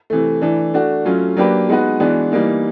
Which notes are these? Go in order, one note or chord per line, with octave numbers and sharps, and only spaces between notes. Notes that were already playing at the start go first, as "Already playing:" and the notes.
C3 E3 A3
E3 A3 D4
A3 D4 F#4
F#3 A3 C#4 F4
F#3 A#3 D4 G4 B4
G#3 B3 D#4 F#4 B4
E3 G#3 B3 D4 F#4
E3 G3 A#3 D#4